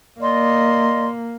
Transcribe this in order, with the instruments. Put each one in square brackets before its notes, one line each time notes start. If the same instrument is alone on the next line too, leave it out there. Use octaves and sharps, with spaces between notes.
[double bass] A#3 [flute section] D5 D#5 C6